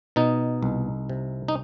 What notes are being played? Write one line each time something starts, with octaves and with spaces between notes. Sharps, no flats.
B2 D#4
C2
C3
D#4